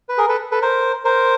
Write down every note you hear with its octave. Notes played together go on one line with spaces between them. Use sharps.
B4
G#4 A#4
A4 B4
A4 B4
A#4 C5
A#4 C5